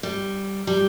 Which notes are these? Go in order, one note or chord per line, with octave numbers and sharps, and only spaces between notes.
G3
G3